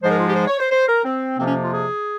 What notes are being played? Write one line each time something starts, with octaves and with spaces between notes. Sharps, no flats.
G#2 F3 G#3 C5
A#4
F4
G4
C5
C#5
C5
C5
A#4
C4
F2 C3 F3 A#3 C4
C#4
F4
G#4